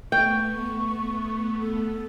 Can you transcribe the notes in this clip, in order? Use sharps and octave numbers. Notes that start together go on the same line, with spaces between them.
A3 B3 G5 C#6
A4